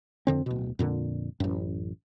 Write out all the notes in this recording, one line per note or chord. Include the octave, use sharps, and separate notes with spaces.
F2 D3 C4
D1 B2
F2 A#2 D3
A1 F#2